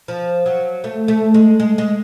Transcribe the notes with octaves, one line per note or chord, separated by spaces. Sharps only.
F3
F#3
A3
A3
G#3
G#3
G#3